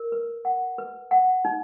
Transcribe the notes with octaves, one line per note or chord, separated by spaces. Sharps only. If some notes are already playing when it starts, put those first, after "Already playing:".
Already playing: A#4
B4
F#5
B4
F#5
D#4